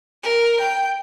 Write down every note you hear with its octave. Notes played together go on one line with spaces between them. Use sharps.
A#4
G5